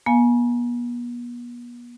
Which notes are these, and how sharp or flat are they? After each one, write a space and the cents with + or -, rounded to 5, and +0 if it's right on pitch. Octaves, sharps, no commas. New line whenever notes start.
B3 -40 F5 +0 G#5 +15